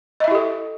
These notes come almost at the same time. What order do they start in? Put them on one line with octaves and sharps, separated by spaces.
D#5 E5 E4 G4 A4